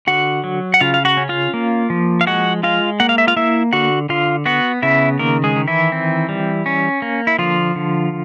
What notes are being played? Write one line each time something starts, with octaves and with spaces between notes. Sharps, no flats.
D3 F#4 F#5
F#3
F#5
C#3 F4 F5
F5
F#4 F#5
C#4
F4 F5
A#3
F3
F5
G#3 F#4 F#5
G#3 F4 F5
A#3 F#5
F5
E5
F4 F5
A#3 E4 E5
D3 F#4 F#5
D3 F4 F5
B3 F#4 F#5
C#3 E4 E5
D#3 A#3 A#4
G#3 G#4
D#3
E3 E4
C4
G3
C#4
A#3
E4
D3 F3 F4
D3